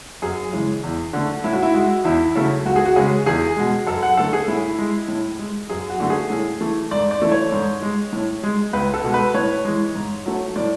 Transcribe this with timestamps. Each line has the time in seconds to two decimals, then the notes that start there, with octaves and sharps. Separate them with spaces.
0.22 F#2 G#4
0.53 C#3 E3 G#3
0.83 E2
1.13 D3 A3
1.44 A2 E4
1.53 F#4
1.62 E4
1.74 G#3 F#4
2.05 E2 E4
2.35 C#3 F#3 A3
2.66 C#2 F#4
2.76 G#4
2.86 F#4
2.96 C#3 G#3 G#4
3.26 E2 G#4
3.57 B2 G#3
3.87 F#2 A4
4.03 F#5
4.17 D3 A3 A4
4.33 G#4
4.48 A2 E4
4.78 G#3
5.08 A2
5.39 G#3
5.70 F#2 G#4
5.90 F#4
6.00 D3 A3
6.10 G#4
6.30 A2
6.60 E3 A3
6.91 G#2 D5
7.11 D5
7.22 E3 A3
7.32 C#5
7.52 G#2
7.82 G#3
8.13 A2
8.43 G#3
8.73 C#2 B4
8.94 A4
9.04 B2 G#3
9.14 B4
9.34 A2 C#5
9.65 E3 G#3
9.95 G#2
10.26 F#3 A3
10.56 A2 D5